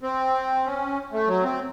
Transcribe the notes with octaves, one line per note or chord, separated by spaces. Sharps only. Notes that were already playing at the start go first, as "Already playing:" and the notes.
C4
C#4
A3
F#3
C4